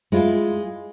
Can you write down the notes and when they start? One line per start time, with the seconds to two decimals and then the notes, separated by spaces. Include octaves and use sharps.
0.12 G#3 E4 F4